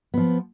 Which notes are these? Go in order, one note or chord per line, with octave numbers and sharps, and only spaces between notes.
F3 B3